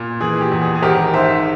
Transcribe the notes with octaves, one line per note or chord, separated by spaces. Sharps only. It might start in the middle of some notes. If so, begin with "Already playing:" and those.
Already playing: A#2
E3 G#4
G4
E2
G#4
G#4
G#1 G4 A#4
G#2 C5 E5